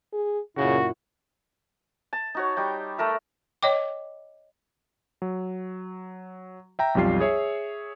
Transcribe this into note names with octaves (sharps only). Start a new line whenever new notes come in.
G#4
F#2 A#2 C#3 E4 F#4
A5
D#4 F#4 C#5
G3 D#4 G5
A3 A4 A#4 E5
C#5 D#5 G5 D6
F#3
E5 G5 A#5
B1 F2 G3 F4 C7
G#4 C#5 E5